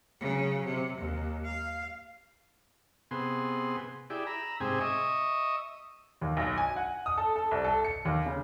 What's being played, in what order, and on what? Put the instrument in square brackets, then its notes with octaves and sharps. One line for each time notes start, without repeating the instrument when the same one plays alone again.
[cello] C#3 F#3
C3
D#2
F5
[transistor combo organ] C3 B3 G#4 C6
E4 G4 G#4 D5
A#5 B5 E6
G#2 C3 C4 G4 G#4 G#5
D#5 E5 C#6 D#6
[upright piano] D#2
B1
G#5
F#5
D#6
A4
A4
C2
A4
C#7
D#2
C#3